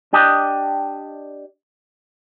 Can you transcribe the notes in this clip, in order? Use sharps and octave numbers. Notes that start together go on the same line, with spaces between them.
D4 G4 D#5